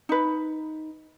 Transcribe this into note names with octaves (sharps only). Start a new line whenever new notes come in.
D#4 B4